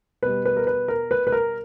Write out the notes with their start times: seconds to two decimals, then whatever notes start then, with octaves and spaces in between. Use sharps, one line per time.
0.23 B2 G3 B4
0.45 B4
0.57 A#4
0.67 B4
0.88 A#4
1.11 B4
1.27 B4
1.32 A#4